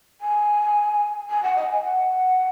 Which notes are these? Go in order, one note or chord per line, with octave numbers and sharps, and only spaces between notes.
G#5
G#5
F#5
D#5
G#5
F#5